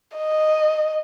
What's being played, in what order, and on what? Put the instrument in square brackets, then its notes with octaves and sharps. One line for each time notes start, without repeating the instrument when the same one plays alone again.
[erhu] D#5